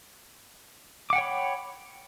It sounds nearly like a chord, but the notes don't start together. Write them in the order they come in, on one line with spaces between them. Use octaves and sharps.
D6 F#5 G5 C#5 B5